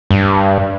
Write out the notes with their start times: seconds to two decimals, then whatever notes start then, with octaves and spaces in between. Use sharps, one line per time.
0.11 G2